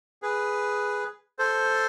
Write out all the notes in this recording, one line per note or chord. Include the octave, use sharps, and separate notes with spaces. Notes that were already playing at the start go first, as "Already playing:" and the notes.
G#4 B4
A4 C5